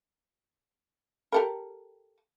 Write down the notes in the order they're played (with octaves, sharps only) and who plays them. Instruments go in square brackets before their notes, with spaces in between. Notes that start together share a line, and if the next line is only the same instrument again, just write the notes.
[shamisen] G4 A4 A#4